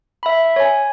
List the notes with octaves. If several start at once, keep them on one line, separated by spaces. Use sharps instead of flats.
E5 B5
C#5 G#5